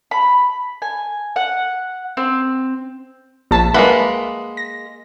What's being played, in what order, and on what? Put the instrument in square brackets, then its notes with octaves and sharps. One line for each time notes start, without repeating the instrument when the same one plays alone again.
[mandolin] B5
G#5
F#5
C4
[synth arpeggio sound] A#1 A5 B6
[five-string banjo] G#3 A#3 B4 [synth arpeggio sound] E5 F#5 B5
[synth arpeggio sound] A#6